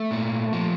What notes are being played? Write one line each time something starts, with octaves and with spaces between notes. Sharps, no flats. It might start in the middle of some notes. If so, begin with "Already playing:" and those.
Already playing: A3
A#2
F3